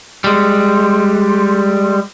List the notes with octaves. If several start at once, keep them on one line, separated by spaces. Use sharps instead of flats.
G3 G#3